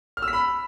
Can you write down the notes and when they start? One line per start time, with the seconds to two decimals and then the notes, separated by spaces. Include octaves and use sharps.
0.17 F6
0.22 E6
0.28 B6
0.33 B5